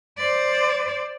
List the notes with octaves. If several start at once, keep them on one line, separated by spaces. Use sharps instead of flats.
C5 D5